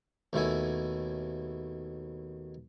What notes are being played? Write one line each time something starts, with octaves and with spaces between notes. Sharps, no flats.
D#2 B2 A3 E4 E5 G#5